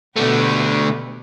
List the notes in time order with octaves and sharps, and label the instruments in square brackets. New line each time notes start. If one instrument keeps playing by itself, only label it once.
[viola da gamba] B2 G4 B4 [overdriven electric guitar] D3 A3